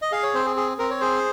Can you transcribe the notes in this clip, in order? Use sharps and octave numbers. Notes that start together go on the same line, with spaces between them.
D#5
G#4 F5
C#5
C4 C5
G#4
G#4
C4 A#4
C#5
G#4 C5